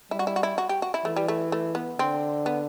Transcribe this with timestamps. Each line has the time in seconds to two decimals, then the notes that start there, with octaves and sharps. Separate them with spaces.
0.11 G3 E4
0.19 F#4
0.27 E4
0.36 F#4
0.43 E4
0.58 F#4
0.69 G4
0.82 F#4
0.94 E4
1.05 E3 A3
1.16 G3
1.28 A3
1.52 A3
1.75 B3
1.99 D3 C4
2.46 B3